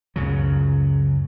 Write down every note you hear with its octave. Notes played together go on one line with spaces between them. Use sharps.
C#2 F#2 C#3 F#3